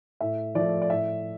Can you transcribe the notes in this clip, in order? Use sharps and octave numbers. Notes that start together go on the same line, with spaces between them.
A2 E5
F3 A3 D5
D5
A2 E5